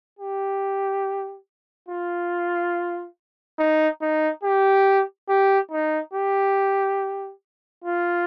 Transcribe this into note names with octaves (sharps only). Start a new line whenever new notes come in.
G4
F4
D#4
D#4
G4
G4
D#4
G4
F4